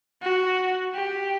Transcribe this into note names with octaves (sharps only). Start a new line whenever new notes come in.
F#4
G4